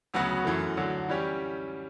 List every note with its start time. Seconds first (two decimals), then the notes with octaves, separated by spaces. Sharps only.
0.14 D2 C#3 F#3 B3 F#4
0.45 F#2 E3 A3
0.77 D2 D3 F#3
1.09 E3 G3 C#4 G4